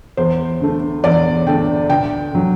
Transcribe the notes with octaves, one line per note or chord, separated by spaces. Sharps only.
E2 C5
D3 A3
E2 D5
D3 A3 G5
D2 G5
D3 F#3